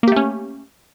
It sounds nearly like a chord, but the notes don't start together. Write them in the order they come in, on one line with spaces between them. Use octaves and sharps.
A#3 G4 A3 C#4